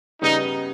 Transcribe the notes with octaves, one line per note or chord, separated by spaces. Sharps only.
C#3 G3 B3 D#4